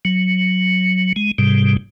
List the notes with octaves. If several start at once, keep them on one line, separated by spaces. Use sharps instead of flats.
F#3
G#3
G#2 C3 G3